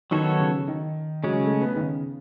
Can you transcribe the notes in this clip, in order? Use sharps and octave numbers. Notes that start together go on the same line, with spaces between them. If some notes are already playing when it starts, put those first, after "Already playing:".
D#3 F#3 B3 F#4 A4 C#5
C#3
D#3
C#3 F#3 G#3 C#4
A3
B3
D#3
C#3